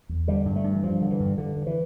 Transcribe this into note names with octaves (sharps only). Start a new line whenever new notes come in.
E2
D3 G3
G2
A3
G2
E3
G2 F3
D3
E3
G2
G2 D3
G2
E3